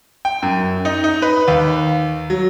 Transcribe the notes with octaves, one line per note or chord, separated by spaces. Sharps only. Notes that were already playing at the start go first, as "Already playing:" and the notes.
G5
F#2
D#4
D#4
B4
D#2
F#3